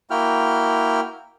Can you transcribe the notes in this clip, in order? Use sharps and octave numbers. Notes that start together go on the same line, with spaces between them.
A#3 E4 F#4 G5 F6